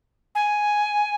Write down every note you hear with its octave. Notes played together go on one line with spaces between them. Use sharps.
G#5